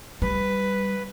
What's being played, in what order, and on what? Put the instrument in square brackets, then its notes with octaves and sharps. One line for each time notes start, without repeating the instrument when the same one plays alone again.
[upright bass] G3 [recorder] B4